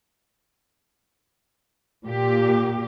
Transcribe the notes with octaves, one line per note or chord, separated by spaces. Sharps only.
A#2 G4